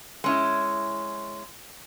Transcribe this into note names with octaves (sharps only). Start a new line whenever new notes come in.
G#3 C#4 E4